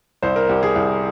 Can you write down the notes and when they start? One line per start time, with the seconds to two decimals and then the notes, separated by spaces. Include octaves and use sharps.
0.23 C2 C5
0.36 A#4
0.49 C2 G4
0.63 G#4
0.76 C2